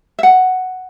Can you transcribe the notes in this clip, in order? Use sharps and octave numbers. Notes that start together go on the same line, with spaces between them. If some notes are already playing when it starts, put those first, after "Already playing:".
E5
F#5